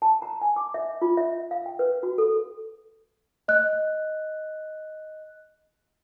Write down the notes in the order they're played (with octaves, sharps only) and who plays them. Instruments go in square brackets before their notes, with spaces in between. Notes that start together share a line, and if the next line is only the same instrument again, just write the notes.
[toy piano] A5
A#5
G#5
D6
E5
F4
E5
F5
G5
B4
F#4
A4
[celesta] D#5 F#6